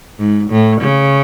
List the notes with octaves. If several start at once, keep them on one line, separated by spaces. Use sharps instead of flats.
G#2
A2
C#3